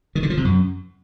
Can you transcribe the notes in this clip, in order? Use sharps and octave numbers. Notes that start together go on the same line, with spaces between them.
D#3
D3
F3
C3
F#2